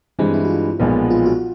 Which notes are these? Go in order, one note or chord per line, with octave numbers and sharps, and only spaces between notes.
G2 E3 G#3 C4
E4
F#4
F4
B1 A#2 F3 G#3 B3
F4
F#4